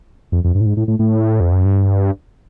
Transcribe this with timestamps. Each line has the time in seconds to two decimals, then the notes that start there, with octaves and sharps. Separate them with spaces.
0.32 F2
0.44 F2
0.55 G2
0.61 A2
0.66 G#2
0.77 A2
0.88 A2
0.99 A2
1.40 F2
1.52 F#2
1.65 G2